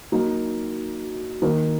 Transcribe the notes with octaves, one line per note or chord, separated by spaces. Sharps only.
F#3 A#3 D#4
D#3 A#3 D#4 A#4